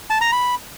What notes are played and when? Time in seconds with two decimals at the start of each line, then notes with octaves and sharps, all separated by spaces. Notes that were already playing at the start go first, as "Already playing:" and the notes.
0.10 A5
0.21 A#5
0.32 B5